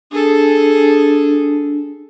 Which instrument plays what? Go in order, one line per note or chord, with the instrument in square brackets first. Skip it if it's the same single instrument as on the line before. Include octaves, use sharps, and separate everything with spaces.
[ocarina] D4 [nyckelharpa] G#4 A4